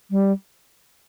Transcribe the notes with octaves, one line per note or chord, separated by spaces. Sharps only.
G3